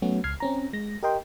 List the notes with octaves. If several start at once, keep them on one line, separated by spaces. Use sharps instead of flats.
F#3 A3 B3 C#4 F#4
C#2 F6 G#6 C7
C4 C#4 A#5
G#3 A#6
G4 A#4 D#5 G5 C6